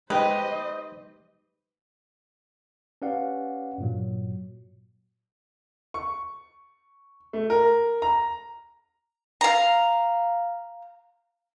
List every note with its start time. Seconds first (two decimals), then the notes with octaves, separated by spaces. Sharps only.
0.10 G#3 D#4 G4 B4 C5 D#5
3.02 C#4 G4 B4 D5 F5 F#5
3.78 G2 A#2 F#3
5.94 C#6
7.33 A3
7.50 A#4
8.02 A#5
9.41 F5 A#5